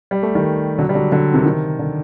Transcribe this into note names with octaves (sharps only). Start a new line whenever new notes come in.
G3
A3
D#3 G3
D3 F#3
G3
D3 F#3
D3 F#3
C3 D#3
C3 D#3
D3